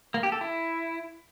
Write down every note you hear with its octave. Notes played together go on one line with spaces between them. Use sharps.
A#3
G4
A4
E4